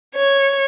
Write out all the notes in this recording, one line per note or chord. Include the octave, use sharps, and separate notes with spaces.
C#5